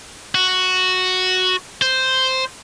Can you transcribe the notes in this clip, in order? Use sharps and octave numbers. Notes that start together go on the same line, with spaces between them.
F#4
C5